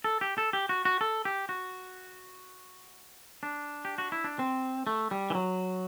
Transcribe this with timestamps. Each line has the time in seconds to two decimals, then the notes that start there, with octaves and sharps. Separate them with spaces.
0.04 A4
0.21 G4
0.38 A4
0.53 G4
0.69 F#4
0.85 F#4
1.01 A4
1.25 G4
1.49 F#4
3.43 D4
3.85 G4
3.98 F#4
4.12 E4
4.24 D4
4.39 C4
4.87 A3
5.11 G3
5.30 E3
5.35 F#3